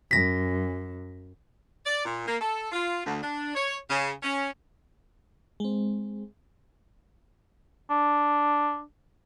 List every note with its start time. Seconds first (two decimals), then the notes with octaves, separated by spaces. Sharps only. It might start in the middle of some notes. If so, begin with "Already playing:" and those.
0.11 F#2 A#6 B6
1.86 D5
2.05 A#2
2.27 A#3
2.40 A4
2.72 F4
3.05 D2
3.22 D4
3.55 C#5
3.90 C#3
4.23 C#4
5.60 G#3 C4
7.90 D4